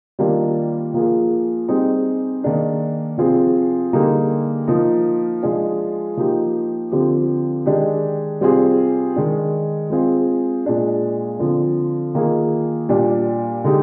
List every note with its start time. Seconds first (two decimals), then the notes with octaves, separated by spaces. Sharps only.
0.19 D#3 G3 A#3 D4 F4
0.94 F3 A#3 F4 G#4
1.68 G3 C4 D#4 G#4
2.43 D#3 A#3 D4 G#4
3.18 C3 F3 C4 F4 G#4
3.93 D3 G3 A#3 D#4 G#4
4.68 F3 A#3 D#4
5.43 F3 G#3 D4 F4 G#4
6.17 F3 A#3 D#4 G4
6.92 D3 F3 C4 G4
7.66 D#3 G#3 D4 G4
8.41 C3 G3 C4 F4 G#4
9.16 D#3 G#3 D4
9.90 G#3 C4 F4 G#4
10.66 A#2 G#3 D4 G#4
11.39 D3 F3 C4
12.15 D#3 A#3 F4 G#4
12.89 A#2 G3 D4
13.64 D3 G#3 D#4 G4